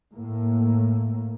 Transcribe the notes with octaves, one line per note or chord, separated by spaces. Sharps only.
A2 A#3